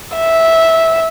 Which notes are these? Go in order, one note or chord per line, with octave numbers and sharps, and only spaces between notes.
E5